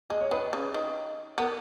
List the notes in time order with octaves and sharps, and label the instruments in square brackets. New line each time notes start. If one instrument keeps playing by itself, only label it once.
[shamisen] G#3 [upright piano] D#5
[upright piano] C#5
[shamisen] D#3 [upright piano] B4
[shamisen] C#3
D#3
[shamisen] B3 [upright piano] A#4